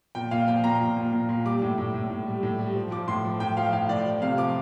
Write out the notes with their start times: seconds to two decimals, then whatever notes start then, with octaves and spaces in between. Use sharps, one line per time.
0.15 A#2 G5
0.31 A#2 F5
0.48 F3 G5
0.63 A#2 A#5
0.80 A#2
0.97 A#2
1.12 A#2
1.29 A#2
1.45 G3 D6
1.62 A2
1.78 A2
1.94 A2
2.10 A2
2.27 G3
2.43 A2
2.59 G3
2.75 F3
2.91 F3 D6
3.07 A2 C6
3.25 F3
3.40 A2 G5
3.57 F3 F5
3.73 A2 F5
3.89 A2 D5
4.05 F3
4.21 C3 F5
4.38 F3 D6